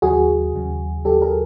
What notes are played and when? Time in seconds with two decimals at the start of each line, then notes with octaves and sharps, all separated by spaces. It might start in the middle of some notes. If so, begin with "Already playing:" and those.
0.02 D#2 C#3 F#3 F#4 G#4
0.54 D#2 C#3 F#3
1.05 D#2 C#3 F#3 G4 A4
1.22 G#4 A#4